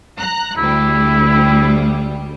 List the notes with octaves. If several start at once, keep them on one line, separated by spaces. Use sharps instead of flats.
A#5 F#6
D2 G3 E4